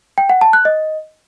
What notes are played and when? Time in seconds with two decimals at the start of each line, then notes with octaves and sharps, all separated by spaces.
0.18 G5
0.30 F#5
0.41 A5
0.53 F#6
0.65 D#5